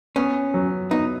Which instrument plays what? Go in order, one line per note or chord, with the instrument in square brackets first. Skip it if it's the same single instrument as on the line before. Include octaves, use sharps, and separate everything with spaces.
[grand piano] B3 [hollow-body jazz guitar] C#4
[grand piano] F#3
[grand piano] B3 [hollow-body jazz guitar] D#4